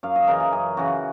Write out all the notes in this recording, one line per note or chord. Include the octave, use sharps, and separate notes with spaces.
F#2 F5
D#5
C#3 E3 A#4
G#4
F#2 G#4
C#3 E3 F#4